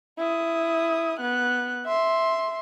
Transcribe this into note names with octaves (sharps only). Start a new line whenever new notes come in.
E4 D#6
B3 F#6
E5 C6